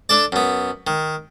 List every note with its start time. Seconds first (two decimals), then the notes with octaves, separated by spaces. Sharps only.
0.09 D4 A4 D5
0.32 F#2 B3
0.87 D#3